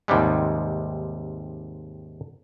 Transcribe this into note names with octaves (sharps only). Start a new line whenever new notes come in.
D#2 G#2 C3 G3 G#3